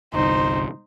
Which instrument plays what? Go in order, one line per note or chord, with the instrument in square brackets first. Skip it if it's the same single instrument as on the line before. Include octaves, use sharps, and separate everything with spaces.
[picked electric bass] G1 C2 [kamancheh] D#4 C5